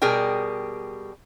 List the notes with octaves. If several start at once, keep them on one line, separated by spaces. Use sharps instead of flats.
B2 G3 G#4 A#4 G5